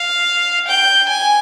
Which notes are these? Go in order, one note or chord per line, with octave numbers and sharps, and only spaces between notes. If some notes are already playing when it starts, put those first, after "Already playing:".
Already playing: F5
G5
G#5